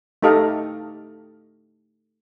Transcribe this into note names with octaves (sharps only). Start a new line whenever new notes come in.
A3 D#4 G4 A4 D#5 F5